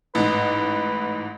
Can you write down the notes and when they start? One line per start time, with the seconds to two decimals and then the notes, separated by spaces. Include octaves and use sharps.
0.15 A1 G#2 B4